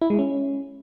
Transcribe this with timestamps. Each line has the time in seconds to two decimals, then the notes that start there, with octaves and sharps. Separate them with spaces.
0.02 E4
0.10 G#3
0.19 C#4